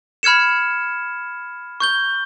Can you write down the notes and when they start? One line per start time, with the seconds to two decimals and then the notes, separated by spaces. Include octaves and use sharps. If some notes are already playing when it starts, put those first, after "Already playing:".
0.23 B5 F6 G#6 C#7 E7
1.80 C#6 G6 G7